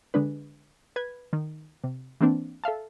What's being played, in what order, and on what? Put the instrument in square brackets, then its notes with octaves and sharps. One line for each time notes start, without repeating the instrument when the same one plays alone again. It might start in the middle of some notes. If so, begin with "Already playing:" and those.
[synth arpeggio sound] D3 G#3 D4 B4
B4 G#6
D#3
C3
E3 A#3 C4 D4
A4 E5 F5 A5